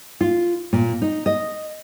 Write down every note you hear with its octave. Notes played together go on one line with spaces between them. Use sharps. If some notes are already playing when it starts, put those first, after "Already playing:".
F4
A#2
D#4
D#5